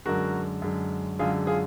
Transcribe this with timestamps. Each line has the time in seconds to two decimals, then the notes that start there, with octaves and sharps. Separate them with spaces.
0.05 F#2 D3 G#3 F#4 A#4
0.62 F#2 D3 G#3
1.19 F#2 D3 G#3 F4 G#4
1.47 F4 G#4